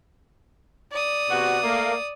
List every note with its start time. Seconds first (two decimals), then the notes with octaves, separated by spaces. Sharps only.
0.92 D5 D#6
1.30 C3 B3 F#4
1.63 A3 A#3